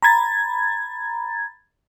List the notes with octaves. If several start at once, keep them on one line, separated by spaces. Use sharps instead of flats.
A#5 B5 G#6 A6